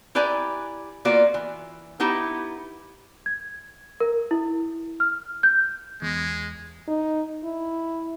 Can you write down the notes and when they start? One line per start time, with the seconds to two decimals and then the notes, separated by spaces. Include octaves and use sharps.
0.15 E4 G4 B4 D5 G#5 A#5
1.05 A#3 B3 F4 F#4 D5
1.34 E3
2.00 B3 D#4 E4 G4
3.26 G#6
4.00 A#4
4.31 E4
5.00 F6
5.43 G6
6.02 E2 G#3
6.88 D#4
7.44 E4